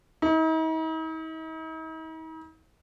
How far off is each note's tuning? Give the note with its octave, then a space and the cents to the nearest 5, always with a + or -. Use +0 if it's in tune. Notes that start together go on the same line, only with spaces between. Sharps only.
D#4 +45